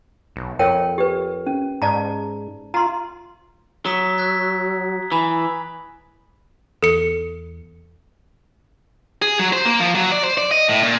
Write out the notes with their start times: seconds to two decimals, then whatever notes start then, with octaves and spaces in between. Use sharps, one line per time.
0.36 B1
0.59 F2 A#4 C#5 G5
0.98 G4 B4
1.46 C#4
1.82 G#2 D5 A5 A#5
2.74 F4 A#5 C6
3.85 F#3 A#5 D#6 B6
4.18 F#6 G#6 B6
5.12 E3 G#5 B5
6.83 E2 A4 C#7
9.22 G#4
9.39 F#3
9.53 C5
9.65 A#3
9.80 F3
9.95 F#3
10.12 D5
10.24 C5
10.38 D5
10.51 D#5
10.68 A2
10.83 A#2